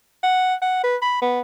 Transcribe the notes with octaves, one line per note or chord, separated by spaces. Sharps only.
F#5
F#5
B4
B5
B3